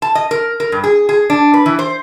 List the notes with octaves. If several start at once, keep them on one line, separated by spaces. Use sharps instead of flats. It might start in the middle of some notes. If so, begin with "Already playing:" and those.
A5
D#5
A#4
A#4
G2
G#4
G#4
D4
B4
E3
C5